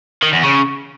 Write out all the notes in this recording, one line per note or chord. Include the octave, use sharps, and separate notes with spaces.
D#3
E2
C#3